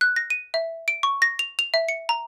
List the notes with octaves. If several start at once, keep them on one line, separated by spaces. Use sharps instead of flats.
F#6
A#6
D#7
E5
D7
C#6
A#6
F7
F7
E5
C#7
A#5